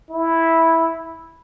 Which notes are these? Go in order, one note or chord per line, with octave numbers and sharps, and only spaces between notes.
E4